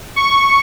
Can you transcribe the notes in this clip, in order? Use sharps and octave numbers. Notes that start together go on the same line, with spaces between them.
C#6